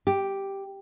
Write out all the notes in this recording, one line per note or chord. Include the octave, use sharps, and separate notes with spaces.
G4